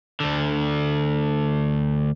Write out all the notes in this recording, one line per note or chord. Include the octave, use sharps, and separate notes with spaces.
D2 D3